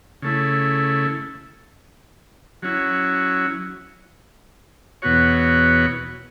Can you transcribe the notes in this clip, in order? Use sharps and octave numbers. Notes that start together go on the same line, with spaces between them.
C#3 A3 E4
F#3 C#4 E4
E2 B2 B3 F#4 C#5